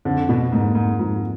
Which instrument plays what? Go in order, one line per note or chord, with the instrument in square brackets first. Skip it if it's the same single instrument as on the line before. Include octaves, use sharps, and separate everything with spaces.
[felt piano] F2 [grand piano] D3
[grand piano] B2
[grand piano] G#2 [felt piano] A#3
[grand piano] G#2
[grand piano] G#2 [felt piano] F3